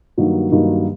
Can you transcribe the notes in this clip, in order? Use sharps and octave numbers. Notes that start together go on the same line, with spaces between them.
G2 D#3 F#3 A#3 D#4
G2 D#3 F#3 A#3 D#4